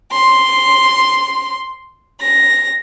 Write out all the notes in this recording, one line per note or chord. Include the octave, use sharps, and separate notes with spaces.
C6
A#6